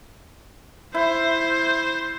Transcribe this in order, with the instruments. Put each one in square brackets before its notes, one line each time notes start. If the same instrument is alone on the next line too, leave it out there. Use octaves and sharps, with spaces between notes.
[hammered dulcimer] E4 [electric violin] C5